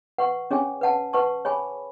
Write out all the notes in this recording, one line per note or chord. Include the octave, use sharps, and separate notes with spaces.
B4 F#5 C#6
C#4 G#4 C#5 G#5
B4 F#5 A5
B4 F#5 A5 C#6
G#4 C#5 G#5 B5